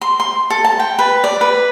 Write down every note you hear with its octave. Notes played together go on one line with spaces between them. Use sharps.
C6
C6
A4
A5
G5
B4
D5
B4